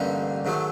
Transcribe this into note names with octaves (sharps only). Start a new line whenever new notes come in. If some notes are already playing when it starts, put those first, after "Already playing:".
Already playing: A1 G2 D3 G3 A#3 D#4
G#2 D#3 F#3 A3